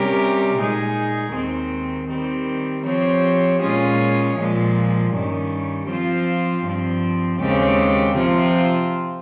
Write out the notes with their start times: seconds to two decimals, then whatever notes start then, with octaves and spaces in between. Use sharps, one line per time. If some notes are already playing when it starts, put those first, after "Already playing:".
Already playing: C3 G3 C#4 G4 A#4
0.58 A#2 G#3 D#4 G#4
1.34 D#2 D#3 G#3 C4
2.10 D#3 G3 C4
2.86 F3 C4 G4 C#5
3.62 A#2 G#3 C#4 F4 G#4
4.37 A#2 F3 G#3
5.13 G2 D#3 G3 C#4
5.89 F3 C4 F4 C5 F5
6.65 G2 F3 C4
7.40 D#2 C#3 G#3 C4 G4
8.17 C3 F3 C4 F4